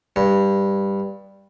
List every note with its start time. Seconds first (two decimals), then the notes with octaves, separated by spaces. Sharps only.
0.16 G2